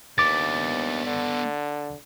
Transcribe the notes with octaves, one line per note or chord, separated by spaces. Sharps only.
D#2 B3 D4 D6 A6
D3